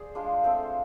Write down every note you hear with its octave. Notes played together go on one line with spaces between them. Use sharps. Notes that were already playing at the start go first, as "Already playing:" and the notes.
Already playing: G#4 C5 D5
G#3 D4 F4
A3 C4 F4 A4